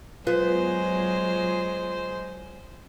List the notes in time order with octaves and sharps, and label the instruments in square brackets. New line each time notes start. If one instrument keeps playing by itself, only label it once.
[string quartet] F#3 G#3 [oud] B3 [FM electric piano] F4 [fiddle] C5